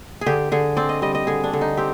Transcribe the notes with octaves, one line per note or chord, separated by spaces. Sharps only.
G#4
D3 G4
D3 G#4
C4 D5
D#5
G3 D#5
D#5
D3 G#4
D4
D3
D#4
C4 G4